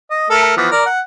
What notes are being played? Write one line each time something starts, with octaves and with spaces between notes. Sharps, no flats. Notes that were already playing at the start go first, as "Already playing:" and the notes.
D#5
A3 A4 A#4
E3 F3 B3
A#4 D5
F#5